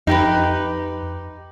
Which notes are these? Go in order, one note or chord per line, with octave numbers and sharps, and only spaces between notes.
F2 D#4 G4 B4